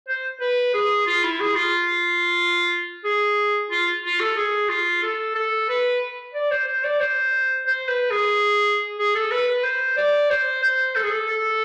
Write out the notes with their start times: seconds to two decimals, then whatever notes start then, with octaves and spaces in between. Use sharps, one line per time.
0.08 C5
0.41 B4
0.74 G#4
1.07 F4
1.23 E4
1.40 G#4
1.56 F4
3.04 G#4
3.71 F4
4.04 F4
4.20 A4
4.36 G#4
4.69 F4
5.03 A4
5.35 A4
5.69 B4
6.34 D5
6.51 C5
6.67 C5
6.84 D5
7.00 C5
7.66 C5
7.89 B4
8.11 G#4
8.99 G#4
9.15 A4
9.31 B4
9.47 B4
9.64 C5
9.97 D5
10.30 C5
10.63 C5
10.96 A4
11.03 G#4
11.11 A4
11.29 A4